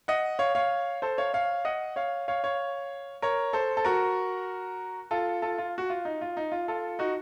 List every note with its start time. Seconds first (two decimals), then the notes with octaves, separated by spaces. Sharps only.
0.08 D#5 F#5
0.39 C#5 F5
0.55 C#5 F5
1.02 A4 C5
1.18 C#5 F5
1.34 C#5 F5
1.65 D#5 F#5
1.96 C#5 F5
2.28 C#5 F5
2.44 C#5 F5
3.22 A#4 C#5
3.53 A4 C5
3.77 A4
3.85 F#4 A#4
5.11 F4 A4
5.42 F4 A4
5.58 F4
5.78 F#4
5.90 F4
6.05 D#4
6.21 F4
6.37 D#4
6.52 F4
6.68 F4 A4
6.99 D#4 F#4